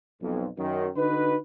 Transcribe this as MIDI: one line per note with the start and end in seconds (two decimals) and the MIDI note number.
0.21 0.46 35
0.21 0.46 41
0.58 0.88 42
0.58 0.88 51
0.58 0.88 54
0.95 1.35 50
0.95 1.35 63
0.95 1.35 66
0.95 1.35 71